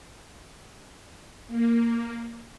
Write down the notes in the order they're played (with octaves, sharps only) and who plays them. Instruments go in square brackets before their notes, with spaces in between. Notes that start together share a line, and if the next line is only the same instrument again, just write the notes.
[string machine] A#3